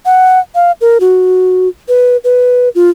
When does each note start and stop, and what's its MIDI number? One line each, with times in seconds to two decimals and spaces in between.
0.06 0.39 78
0.55 0.72 77
0.81 0.98 70
1.00 1.69 66
1.88 2.17 71
2.24 2.69 71
2.75 2.90 65